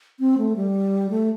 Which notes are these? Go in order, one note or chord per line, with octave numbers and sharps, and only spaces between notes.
C4
A3
G3
A3